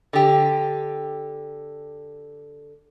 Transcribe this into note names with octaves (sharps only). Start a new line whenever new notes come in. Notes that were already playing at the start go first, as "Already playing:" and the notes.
D3 G4